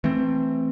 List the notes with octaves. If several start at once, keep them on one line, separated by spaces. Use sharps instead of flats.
E3 A3 C4